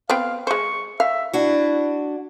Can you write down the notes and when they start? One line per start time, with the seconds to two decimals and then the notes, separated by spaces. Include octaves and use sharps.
0.10 B3 C4 F5 G5
0.47 G#3 C5 C#6
1.00 E5 F5
1.33 D4 E4 F#4